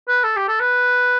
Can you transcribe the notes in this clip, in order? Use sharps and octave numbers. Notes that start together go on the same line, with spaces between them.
B4
A4
G4
A4
B4